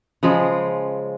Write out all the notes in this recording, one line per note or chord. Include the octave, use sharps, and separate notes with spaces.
C#3 F3 G#3